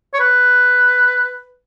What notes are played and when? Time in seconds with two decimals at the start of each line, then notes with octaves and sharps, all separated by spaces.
0.14 C#5
0.20 B4